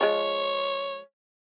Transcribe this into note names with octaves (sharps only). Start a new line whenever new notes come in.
F3 G#3 C#5